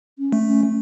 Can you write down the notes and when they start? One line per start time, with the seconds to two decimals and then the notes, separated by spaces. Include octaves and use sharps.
0.19 C#4
0.32 A3
0.47 C#4